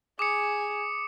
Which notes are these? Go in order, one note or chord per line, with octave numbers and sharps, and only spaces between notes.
G#4 D6 D#6 C#7